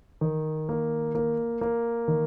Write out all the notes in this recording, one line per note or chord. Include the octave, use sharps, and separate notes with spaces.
D#3
A#3
A#3
A#3
D#3